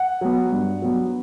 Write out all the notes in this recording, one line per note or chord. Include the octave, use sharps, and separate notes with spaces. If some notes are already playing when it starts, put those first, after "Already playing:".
Already playing: F#5
F#3 B3
G2
F#3 B3